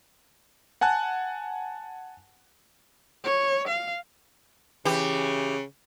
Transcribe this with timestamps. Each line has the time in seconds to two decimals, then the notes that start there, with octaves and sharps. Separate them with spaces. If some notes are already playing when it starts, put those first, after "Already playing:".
0.81 F#5 G#5 A5 F#6
3.24 C#5
3.68 F5
4.85 C#3 E3 G4